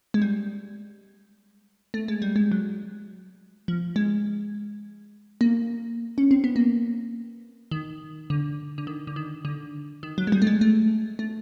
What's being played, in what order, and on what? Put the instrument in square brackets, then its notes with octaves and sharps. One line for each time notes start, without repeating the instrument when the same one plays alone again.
[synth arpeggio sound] G#3
G3
A3
G#3
G3
G#3
F#3
F3
G#3
A#3
C#4
C4
B3
A#3
D#3
D3
D3
D#3
D3
D#3
D3
D#3
F#3
G#3
G3
A3
G#3
A3
A3